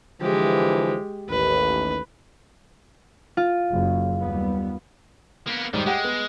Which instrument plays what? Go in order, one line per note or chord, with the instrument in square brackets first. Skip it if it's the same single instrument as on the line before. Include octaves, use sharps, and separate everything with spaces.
[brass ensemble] D3 E3 F3 [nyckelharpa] G#3 G4
[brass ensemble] A1 D#2 [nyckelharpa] B4
[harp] F4
[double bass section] F#1 F#2
D#2 G3 B3
[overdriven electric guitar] A#3 B3
[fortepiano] G#2 G3 [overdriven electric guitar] D#3
[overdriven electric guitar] G#3 [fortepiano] G4 F#5 G5
[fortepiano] B3